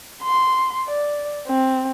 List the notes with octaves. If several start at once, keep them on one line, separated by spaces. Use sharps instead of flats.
C6
D5
C4